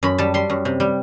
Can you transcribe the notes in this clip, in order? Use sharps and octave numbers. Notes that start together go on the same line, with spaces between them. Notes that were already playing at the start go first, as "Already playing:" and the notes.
F#2 B5
G3 A5
G3 C6
F#2
C3
G3